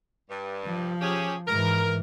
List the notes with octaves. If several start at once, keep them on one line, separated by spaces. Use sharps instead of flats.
G2
F3
C#4 G4 G#4
G#2 E3 A#4